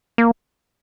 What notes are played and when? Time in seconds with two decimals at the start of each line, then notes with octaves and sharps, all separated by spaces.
0.18 A#3